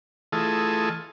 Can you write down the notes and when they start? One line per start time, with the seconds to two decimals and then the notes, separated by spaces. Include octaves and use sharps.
0.32 E3 A3 F4 G#4 A4 D#5